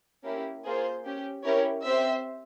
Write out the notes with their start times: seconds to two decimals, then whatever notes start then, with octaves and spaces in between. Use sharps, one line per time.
0.24 A#3 C#4 E4 G4
0.65 A#3 F4 G#4 C5
1.05 C#4 G4
1.45 C#4 E4 G4 A#4 C#5
1.85 C4 G4 C5 E5